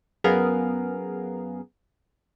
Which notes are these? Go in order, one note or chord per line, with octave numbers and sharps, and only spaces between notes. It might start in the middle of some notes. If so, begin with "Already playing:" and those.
F#2 B3 G#4 A#4 F5